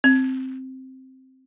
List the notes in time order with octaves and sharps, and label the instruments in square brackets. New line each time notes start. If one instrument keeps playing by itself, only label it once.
[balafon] C4